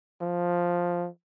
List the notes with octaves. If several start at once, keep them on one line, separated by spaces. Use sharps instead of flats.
F3